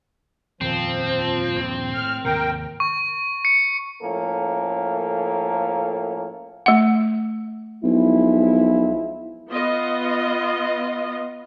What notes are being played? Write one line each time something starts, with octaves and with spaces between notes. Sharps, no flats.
D#1 F2 D#3 F3 C4
D#1 A#1 G2
A2 F6
D#2 G#2 C3 A#4 G5
C#6
C#7
A2 F3 A#3 C#4 A4
A3 F#5
B1 F3 G#3 E4
B3 F4 D#5